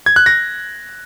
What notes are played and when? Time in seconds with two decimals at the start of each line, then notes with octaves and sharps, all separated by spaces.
0.06 G#6
0.16 F#6
0.26 A#6